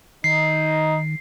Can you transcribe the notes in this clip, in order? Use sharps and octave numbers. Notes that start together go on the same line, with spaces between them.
D#3 D#4 C7